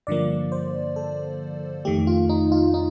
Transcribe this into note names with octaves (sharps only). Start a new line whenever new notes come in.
G2 D3 F3 A#3 D5
C5
A4
F2 D#3 A3 G4
F4
D#4
F4
D#4